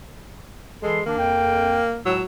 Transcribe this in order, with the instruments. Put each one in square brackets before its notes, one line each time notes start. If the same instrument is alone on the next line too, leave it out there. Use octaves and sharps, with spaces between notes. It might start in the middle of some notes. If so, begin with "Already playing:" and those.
[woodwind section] E3 A4 C6 [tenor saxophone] G#3
[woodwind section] D#3 D4 [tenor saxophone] A#3
[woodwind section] F2 G5
[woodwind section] C#2 A2 E6 [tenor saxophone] F#3